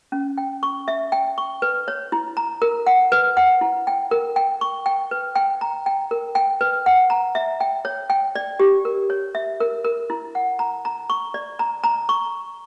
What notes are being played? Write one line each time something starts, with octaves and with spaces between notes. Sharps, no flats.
C#4
G5
C#6
E5
G5
C#6
B4
C#5
E4
A#5
A#4
F#5
B4
F#5
E4
G5
A#4
G5
C#6
G5
B4
G5
A#5
G5
A#4
G5
B4
F#5
A#5
E5
G5
C#5
G5
D5
G4
A#4
C#5
E5
A#4
A#4
E4
F#5
A#5
A#5
C#6
D5
A#5
A#5
C#6